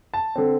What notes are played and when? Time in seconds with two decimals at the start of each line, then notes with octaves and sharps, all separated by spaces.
0.14 A5
0.36 D3 C4